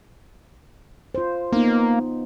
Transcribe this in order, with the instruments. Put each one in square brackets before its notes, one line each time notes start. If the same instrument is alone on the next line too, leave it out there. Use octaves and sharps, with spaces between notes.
[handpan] F4 C5
[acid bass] A#3 [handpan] B3 D#4